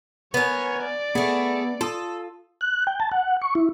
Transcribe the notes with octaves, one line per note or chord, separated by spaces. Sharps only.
B3 A#4 C#5 G#5
D5
A3 B3 G#4
F4 A4 D#6
F#6
G5
A5
F#5
C#6
E4